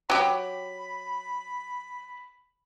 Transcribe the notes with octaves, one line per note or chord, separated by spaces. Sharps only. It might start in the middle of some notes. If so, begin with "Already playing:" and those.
F#3 G4 B5